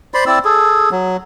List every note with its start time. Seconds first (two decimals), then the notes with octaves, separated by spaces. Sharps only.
0.14 C5 D5 B5 C6
0.26 C4 E4 D5 E6
0.45 G#4 A4
0.91 F#3